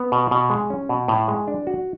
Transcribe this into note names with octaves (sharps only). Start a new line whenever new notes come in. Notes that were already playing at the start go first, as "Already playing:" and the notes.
Already playing: B3
B2
B2
G#3
C#4
B2
A2
G#3
D4
F#4